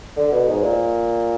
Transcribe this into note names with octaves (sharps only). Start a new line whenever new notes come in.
D3
B2
G#2
A#2